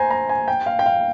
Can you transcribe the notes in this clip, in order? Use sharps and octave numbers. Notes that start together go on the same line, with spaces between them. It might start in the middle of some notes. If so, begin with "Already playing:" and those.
Already playing: C5 G#5 A#5
A#5
G#5
G5
F5
G5
F5